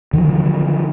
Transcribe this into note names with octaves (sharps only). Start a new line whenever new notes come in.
D3 D#3 F3 F#3